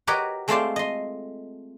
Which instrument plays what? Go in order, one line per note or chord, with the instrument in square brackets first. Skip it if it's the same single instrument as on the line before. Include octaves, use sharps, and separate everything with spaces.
[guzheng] F#4 G4 A#4 B4 C#5 D#5
G#3 A3 C4 F4 C5 D5
D#5 C6